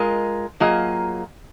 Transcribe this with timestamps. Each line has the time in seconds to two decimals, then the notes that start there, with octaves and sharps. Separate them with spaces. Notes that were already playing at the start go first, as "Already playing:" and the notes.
Already playing: G#3 F4 A#4 D#5
0.60 F#3 A#3 F4 G#4 D#5